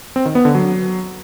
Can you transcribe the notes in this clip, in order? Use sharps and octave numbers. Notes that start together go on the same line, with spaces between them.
C4
D#3
B3
D3
F#3